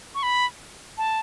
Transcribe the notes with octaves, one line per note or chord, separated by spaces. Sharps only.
C#6
B5
A5